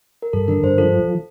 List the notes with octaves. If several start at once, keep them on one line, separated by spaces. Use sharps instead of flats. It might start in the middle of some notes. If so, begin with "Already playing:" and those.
A#4
G2 A4
D3 A#4
G2 C5
F3 A4